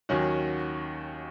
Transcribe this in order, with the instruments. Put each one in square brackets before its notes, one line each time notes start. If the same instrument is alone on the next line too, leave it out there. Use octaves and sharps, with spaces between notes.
[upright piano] D#2 D#3 F#3 C#4 F#4